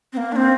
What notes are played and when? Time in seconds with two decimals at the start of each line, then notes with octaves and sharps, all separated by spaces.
0.13 C4
0.17 A#3
0.32 D4
0.36 C4